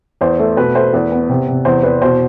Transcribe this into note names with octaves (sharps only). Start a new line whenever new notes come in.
E2 C5
A3
B2 B4
A3 C5
E2 B4
B3
C3
C3
E2 C5
E2 B4
B2 C5